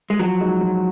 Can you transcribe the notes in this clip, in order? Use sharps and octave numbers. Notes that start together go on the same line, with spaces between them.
G#3
F3 F#3
G#3 D#4 F#4
F3